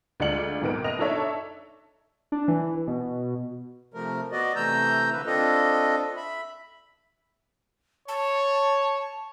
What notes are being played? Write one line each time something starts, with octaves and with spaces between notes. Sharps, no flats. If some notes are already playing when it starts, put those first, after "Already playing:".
D2 G#3 F4 D5 C#7 F#7
G#1 A#2 D#3 B3 A#4 D7
F#1 D#5 F7
D4 D#4 A4 C#5 E5
D4
E3
B2
C3 F3 A3 A#4
B3 F#4 D5 D#5
C3 E3 A3 A#5 E6 G6
D3 A#3 B4
C4 D4 F4 A4 D#5
E5 B5
C#5 A5